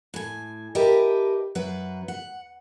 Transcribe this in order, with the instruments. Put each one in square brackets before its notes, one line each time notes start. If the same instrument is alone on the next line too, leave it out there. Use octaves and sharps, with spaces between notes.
[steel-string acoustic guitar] A2 G#5
G4 A#4 B4 D#5 E5 A5
F#2 F#3 B4 E5 F#5
F#5